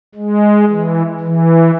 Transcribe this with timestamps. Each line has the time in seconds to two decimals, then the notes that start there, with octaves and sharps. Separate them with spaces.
0.15 G#3
0.70 E3
1.20 E3